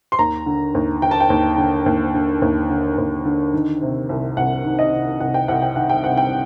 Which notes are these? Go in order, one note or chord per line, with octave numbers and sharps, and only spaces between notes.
C6
D#2 A#5
D3
D#2
D3 G5
A5
G5
D#2
D3
D#2
D3
D#2
D3
D#2
D3
D#3
C3
C2
C2 F#5
D#3
D#5
C3
C2 F#5
G5
C2 F#5
G5
D#3 F#5
G5
C3 F#5
G5